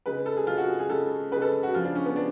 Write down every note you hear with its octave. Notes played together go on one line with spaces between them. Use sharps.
C#3 G#3 B4
A4
G#4
C#3 G#3 F4
F#4
G#4
G#4
C#3 G#3 A4
C#3 G#3 B4
A4
F#4
C#3 F3 G#3 F4
D4
C#4
B3
D4